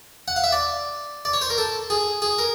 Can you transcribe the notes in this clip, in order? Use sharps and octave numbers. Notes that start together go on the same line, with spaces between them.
F#5
F5
E5
D5
D5
C#5
C5
A#4
A4
G#4
G#4
A#4